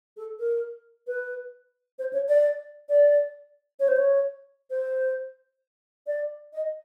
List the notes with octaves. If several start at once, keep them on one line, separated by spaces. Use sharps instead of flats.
A4
A#4
B4
C5
C#5
D5
D5
C#5
C5
C#5
C5
D5
D#5